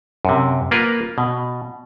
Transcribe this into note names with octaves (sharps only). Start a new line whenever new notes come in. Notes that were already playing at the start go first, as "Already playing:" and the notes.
F#2 C3
A#3 F4 A#4 B4
B2